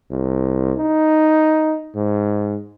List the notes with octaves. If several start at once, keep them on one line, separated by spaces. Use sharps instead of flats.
C2
D#4
G#2